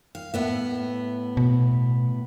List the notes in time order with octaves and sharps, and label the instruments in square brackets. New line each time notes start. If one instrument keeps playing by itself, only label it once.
[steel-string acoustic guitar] F5
A2 B3 E5
[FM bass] B2